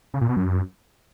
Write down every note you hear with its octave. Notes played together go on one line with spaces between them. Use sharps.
C#3
A#2
B2
F#2